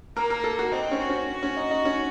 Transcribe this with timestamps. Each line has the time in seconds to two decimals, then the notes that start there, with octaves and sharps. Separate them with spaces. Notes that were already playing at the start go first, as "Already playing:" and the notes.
0.17 A#3 A#4
0.30 A#4
0.44 A4
0.59 F#4
0.72 C4 D#4
0.91 C#4
1.01 F#4
1.10 C#4
1.43 C#4
1.57 D#4
1.71 D#4
1.85 C#4